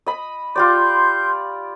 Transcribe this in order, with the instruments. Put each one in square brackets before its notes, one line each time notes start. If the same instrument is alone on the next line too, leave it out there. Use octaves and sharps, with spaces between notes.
[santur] D#5 B5
[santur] F4 G4 D5 [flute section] C6 G6